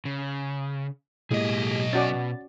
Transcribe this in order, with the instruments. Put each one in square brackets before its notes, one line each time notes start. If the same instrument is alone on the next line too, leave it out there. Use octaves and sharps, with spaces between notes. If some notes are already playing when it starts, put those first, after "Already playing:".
[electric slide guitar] C#3
[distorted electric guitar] B1 D#5 [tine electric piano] A2 G#3 A#3 [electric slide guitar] G4 G#4
[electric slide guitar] B2 [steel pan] C#4 F#4 D5 [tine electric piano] A6